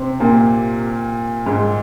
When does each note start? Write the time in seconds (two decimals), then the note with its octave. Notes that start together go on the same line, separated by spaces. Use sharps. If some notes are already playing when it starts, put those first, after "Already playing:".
Already playing: C3 C4
0.20 A#2 A#3
1.46 G#2 G#3